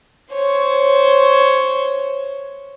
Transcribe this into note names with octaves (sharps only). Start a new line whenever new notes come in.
C5 C#5